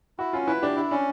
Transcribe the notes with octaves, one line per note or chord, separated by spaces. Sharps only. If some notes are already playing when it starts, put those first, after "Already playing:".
E4 F#4
C#4 F4
E4 B4
D4 G4
D4 E4
C#4 D4